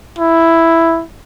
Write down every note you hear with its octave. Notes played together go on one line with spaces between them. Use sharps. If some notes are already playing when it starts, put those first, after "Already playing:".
E4